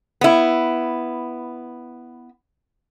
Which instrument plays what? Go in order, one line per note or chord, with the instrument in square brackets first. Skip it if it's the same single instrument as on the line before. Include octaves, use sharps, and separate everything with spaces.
[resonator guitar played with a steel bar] B3 E4